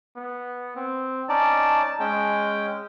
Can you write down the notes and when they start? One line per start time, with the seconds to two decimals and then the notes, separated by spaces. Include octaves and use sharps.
0.16 B3
0.76 C4
1.29 C#4 D#4 D5 A5
2.00 G#3 C#4 G5